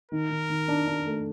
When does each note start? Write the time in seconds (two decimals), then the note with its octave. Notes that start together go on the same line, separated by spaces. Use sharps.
0.12 D#3 A#4
0.30 D#3
0.50 D#3
0.68 D4
0.87 D4
1.06 A3